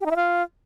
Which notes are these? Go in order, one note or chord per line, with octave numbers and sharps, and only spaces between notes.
G4
D#4
E4
F4